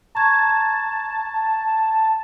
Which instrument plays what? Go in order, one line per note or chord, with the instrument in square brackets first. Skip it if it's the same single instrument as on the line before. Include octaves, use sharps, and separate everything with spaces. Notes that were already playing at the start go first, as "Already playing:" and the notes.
[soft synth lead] A5 [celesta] A#5 C#6 G#6